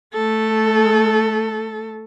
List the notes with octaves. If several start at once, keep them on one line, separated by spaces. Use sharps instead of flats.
A3 A4